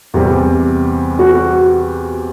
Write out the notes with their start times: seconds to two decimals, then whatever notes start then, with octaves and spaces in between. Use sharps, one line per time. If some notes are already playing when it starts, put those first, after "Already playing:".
0.14 E2 C3 G3
1.19 F#4